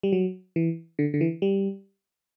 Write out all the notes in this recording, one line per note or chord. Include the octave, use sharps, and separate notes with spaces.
G3
F#3
E3
D3
D3
E3
G3